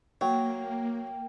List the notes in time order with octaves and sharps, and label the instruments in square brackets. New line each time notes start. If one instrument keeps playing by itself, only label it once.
[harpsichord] F#3 [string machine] A#3 [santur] G5